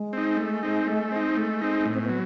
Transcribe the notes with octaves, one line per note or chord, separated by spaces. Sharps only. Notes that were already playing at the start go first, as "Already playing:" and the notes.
Already playing: G#3
C4 D#4
A3
C4 D#4
A3
C4 D#4
G#3 A3
C4 D#4
A2
C4
B3
F#3